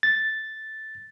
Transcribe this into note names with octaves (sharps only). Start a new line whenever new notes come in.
A6